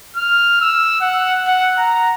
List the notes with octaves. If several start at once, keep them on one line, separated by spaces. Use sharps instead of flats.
F6
E6
F#5
F#5
A#5